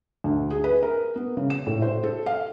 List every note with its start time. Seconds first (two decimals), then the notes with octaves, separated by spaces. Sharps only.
0.24 D2
0.50 G#4
0.64 B4
0.83 A#4
1.16 B3
1.37 C#3
1.50 E7
1.67 A2
1.82 C5
2.04 A4
2.26 F5